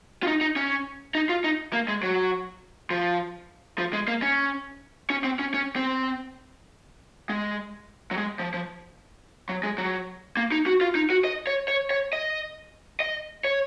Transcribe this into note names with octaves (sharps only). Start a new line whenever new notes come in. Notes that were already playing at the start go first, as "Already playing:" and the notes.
F4
D#4
D#4
C#4
D#4
F4
D#4
A#3
G#3
F#3
F3
F3
G#3
A#3
C#4
C#4
C4
C#4
C#4
C4
G#3
F#3
G#3
F3
F3
F#3
G#3
F#3
A#3
D#4
F#4
F4
D#4
F#4
D#5
C#5
C#5
C#5
D#5
D#5
C#5